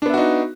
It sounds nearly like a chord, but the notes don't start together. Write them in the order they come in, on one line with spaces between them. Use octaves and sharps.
D4 B3 E5 F#4 D#4